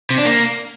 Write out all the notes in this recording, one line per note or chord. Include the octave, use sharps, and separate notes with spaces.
C3
D4
A#3